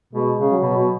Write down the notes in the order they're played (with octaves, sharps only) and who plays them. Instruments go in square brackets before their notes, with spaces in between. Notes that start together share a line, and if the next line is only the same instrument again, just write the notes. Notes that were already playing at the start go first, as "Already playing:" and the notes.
[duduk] B2 [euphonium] G#3
[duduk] C#3
[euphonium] F#3
[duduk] B2
B2